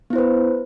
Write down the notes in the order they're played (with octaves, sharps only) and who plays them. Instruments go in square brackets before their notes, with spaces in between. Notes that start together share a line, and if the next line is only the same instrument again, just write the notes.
[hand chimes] B3
E4
C5
B4